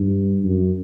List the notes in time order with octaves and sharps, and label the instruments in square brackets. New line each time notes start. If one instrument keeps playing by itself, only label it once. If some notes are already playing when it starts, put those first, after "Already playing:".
Already playing: [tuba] G2
F#2